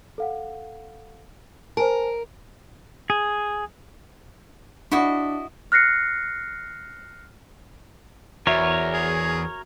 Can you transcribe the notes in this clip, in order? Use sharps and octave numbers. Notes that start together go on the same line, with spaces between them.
A4 F5 F#5
A#4 C5 G#5 A5
G#4
D4 E4 F#4 D#5
F6 F#6 A#6 C7 C#7
E2 F#4 A#4 C#5 E5 D6
G#4